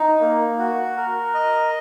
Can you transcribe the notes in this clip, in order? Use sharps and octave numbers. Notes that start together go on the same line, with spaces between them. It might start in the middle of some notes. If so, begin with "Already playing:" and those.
Already playing: D#4
A#3
F#4
A#4
D#5